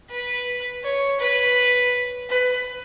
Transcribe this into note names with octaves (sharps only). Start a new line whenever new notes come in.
B4
C#5
B4
B4